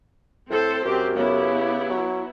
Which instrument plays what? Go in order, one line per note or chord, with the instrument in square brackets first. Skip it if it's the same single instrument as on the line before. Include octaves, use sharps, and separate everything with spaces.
[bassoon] A2 [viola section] C4 A4 C5
[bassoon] F#2 [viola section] C4 G4
[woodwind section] C#3 G4 [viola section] B3 E4
[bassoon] F#3